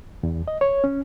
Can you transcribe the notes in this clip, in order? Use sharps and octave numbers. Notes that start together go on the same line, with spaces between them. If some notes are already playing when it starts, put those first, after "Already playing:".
E2
D#5
C#5
C#4